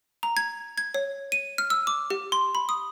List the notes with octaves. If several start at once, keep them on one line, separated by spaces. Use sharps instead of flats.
A#5
G#6
G#6
C#5
D#7
F6
E6
D6
G4
C6
B5
D#6